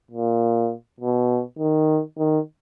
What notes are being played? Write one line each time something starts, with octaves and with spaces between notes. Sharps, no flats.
A#2
B2
D#3
D#3